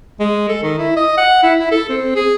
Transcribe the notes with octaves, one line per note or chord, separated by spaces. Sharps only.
G#3
A4
D#3
E4
D#5
F#5
E4
E4
A4
C4
G#4